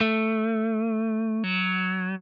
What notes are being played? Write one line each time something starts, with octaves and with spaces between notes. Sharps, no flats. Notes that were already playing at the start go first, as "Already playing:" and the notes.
A3
F#3